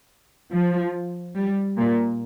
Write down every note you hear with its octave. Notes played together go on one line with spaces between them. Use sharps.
F3
G3
A#2